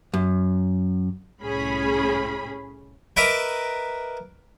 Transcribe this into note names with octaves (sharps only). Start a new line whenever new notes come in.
F#2
C2 A2 C#4 G#4 B5
A#4 B4 D#5 E5 A#5 D6